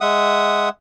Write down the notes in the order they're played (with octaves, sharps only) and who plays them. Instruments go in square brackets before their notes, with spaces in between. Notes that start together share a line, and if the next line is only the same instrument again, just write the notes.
[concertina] G#3 E5 F#5 D#6